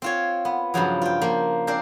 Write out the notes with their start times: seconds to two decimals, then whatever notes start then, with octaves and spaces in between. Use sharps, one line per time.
0.02 C4 F4 C#5
0.45 B3
0.74 G2 C#3 F3 F#3
1.02 F4 G5
1.21 F3 A#3
1.67 C4 D4 A#4 C5